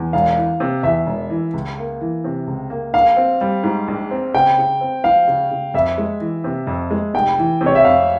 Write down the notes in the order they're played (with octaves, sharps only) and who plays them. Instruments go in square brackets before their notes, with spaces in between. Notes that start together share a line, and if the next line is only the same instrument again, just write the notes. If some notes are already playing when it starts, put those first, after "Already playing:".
Already playing: [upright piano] E2
[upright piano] E1 [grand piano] F5
[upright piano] E3
C3
[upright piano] E2 [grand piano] E5
[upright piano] E1
E3
C#2
A#3
E3
C3
C#2
A#3
[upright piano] A#1 [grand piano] F5
[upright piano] C4
G3
G#2
A#1
C4
[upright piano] C#3 [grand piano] G5
[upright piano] C#3
C4
[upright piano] F3 [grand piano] F5
[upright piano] C#3
C#3
[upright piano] F2 [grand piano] E5
[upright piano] G#3
E3
C3
F2
G#3
[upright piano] F1 [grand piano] G5
[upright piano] E3
C3
[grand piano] C#5
E5
[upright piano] F2 [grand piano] F5